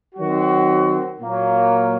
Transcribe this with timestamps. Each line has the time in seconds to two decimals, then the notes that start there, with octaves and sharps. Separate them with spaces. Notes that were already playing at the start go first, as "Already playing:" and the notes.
0.15 D#3 F#3 C4 F#4
1.19 A#2 F#3 A#3